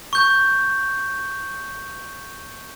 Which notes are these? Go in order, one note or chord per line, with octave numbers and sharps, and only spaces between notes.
C#6 G6